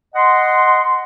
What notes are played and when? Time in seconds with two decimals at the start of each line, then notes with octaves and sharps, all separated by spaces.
0.15 D#5 F#5 C6